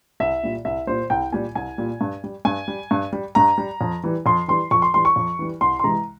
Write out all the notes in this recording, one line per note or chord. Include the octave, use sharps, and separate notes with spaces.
C2 E5
A#2 G3
C2 E5
A#2 G3 C5
C2 G5
A#2 G3 G#5
C2 G#5
A#2 G3
G2
G3
G2 G#5
G3
G2
G3
G2 A#5
G3
F2
E3 G3
F2 C6
E3 G3 C6
F2 C#6
C6
E3 G3 C6
C#6
F2
E3 G3
C2 C6
C6
C3 E3 G#3 A#5